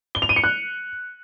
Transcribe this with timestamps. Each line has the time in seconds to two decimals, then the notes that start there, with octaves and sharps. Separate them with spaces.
0.15 G7
0.22 F7
0.29 D#7
0.36 C#7
0.44 F#6